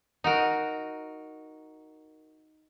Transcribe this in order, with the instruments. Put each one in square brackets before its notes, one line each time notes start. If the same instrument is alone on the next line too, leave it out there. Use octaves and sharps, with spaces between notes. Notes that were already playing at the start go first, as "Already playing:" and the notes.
[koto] D#4 F#4 A#4